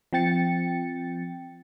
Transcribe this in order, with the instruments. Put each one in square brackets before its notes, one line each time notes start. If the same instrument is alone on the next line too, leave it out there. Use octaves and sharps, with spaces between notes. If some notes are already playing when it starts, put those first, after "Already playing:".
[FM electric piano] F3 C4 G5 A6 C#7